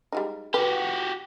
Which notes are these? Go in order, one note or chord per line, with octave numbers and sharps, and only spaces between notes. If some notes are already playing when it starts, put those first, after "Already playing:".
G3 G#3 D#4
F#4 G4 B4